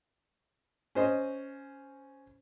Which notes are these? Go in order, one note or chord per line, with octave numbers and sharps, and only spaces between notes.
C#4 C5 D#5